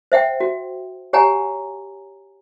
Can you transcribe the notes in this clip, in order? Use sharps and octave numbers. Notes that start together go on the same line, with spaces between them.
C5 E5 F#5 G5
F#4
G4 C#5 F#5 G#5 A#5